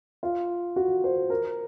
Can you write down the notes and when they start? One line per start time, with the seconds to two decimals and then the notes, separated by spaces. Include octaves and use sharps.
0.23 F4
0.76 F#4
1.04 C5
1.30 A#4